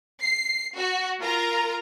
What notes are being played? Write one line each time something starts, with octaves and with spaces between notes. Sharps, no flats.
C7
F#4
F4 A#4 A#5